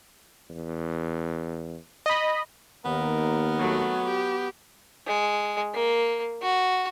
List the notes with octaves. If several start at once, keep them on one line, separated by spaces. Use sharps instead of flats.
E2
D#5 B5
D#2 B3 A#4
F#3 A3
G4
G#3
A#3
F#4